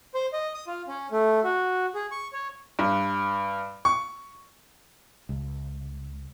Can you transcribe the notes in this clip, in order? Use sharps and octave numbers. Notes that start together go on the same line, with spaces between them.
C5
D#5
D#6
F4
C#4
A3
F#4
G#4
C#6
C#5
G2
C#6
C#2